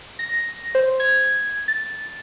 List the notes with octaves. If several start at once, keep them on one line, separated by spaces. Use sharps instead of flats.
A#6
C5
G#6
A6